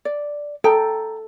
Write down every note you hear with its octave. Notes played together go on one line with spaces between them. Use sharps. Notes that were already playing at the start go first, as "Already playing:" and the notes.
D5
A4 G5 A#5